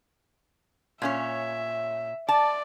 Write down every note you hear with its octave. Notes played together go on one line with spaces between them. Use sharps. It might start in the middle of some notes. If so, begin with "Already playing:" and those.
A#2 C#4 C#5 E5
D5 A5